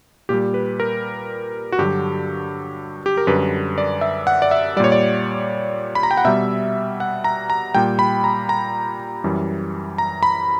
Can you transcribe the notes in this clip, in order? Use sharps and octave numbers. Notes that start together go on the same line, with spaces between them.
A#2 G3 G4
B4
A#4
F#4
G2 D3 F#3 G4
G4
A#4
F#2 D3 G3 B4
D5
E5
F#5
D5
E5
A#2 G3 C#5 D5
D5
B5
A#5
G5
F#5
B2 G3 E5
F#5
A#5
A#5
A#2 G3 G5
B5
A#5
A#5
F#2 E3 G3
A#5
B5